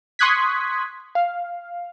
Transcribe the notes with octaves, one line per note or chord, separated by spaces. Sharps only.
C6 C#6 D#6 F#6 G#6 B6
F5